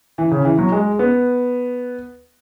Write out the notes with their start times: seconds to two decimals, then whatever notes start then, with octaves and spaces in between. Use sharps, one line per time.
0.18 E3
0.31 C#3
0.45 E3
0.58 F#3
0.72 G#3
0.99 B3